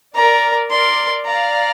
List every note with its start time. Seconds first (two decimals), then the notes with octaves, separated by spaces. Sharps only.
0.15 A#4 D5 A#5
0.70 A#4 D5 C6
1.26 D5 F5 A#5